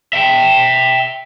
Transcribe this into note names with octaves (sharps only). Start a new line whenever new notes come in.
E5 G5